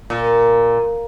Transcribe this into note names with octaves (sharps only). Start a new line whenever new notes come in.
A#2